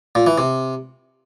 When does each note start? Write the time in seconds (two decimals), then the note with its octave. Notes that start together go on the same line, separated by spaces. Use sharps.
0.15 A#2
0.26 E3
0.38 C3